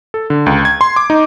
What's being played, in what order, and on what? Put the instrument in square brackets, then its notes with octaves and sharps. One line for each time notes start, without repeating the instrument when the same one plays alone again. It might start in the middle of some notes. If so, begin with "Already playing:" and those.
[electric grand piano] A4
D3
C#2
G#6
C6
D6
D#4